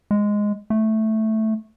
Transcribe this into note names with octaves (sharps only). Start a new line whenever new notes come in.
G#3
A3